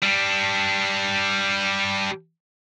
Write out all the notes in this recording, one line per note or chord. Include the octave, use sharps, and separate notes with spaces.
G3 D4